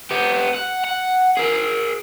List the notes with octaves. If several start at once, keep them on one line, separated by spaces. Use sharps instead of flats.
B3 G4
F#5
F#5
G#4 A#4